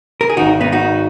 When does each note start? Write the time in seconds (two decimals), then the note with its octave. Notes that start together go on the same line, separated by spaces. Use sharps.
0.21 A#4
0.29 G#4
0.37 G#1 G#2 D#3 D#4 F#4
0.61 B3 D#4
0.72 D#4 F#4